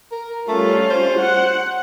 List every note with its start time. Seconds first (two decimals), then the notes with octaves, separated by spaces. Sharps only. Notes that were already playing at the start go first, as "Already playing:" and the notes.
0.12 A#4
0.48 G3 A3 C#4 F4
0.90 C5
1.21 F#5